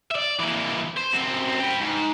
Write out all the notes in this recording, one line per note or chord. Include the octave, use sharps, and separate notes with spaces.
D5 E5
E3 A#3
C5
F#2 C4
B4 G5
G#2